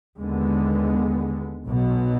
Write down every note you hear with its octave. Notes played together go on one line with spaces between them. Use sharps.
D#2 D3 G#3 B3
B1 B2 F#3